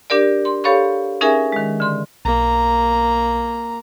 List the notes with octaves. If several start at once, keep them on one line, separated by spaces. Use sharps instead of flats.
D4 G4 A#4 D5
C6
G4 A4 C#5 F5 B5 C#6
C#4 D#4 G#4 A#4 E5 G#5
D#3 G#3
D3 C6
B1 A#3 A#5